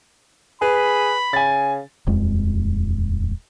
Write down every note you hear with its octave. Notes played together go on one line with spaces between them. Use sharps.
G#4 B4 B5
C#3 G#5 A6
D#1 F2 G#3